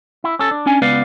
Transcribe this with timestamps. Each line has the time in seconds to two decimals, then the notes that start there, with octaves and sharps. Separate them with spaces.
0.24 E4
0.39 C#4 A4
0.51 D4
0.66 C#4 D4 G#5
0.82 C#2 B3 B4 D5 F5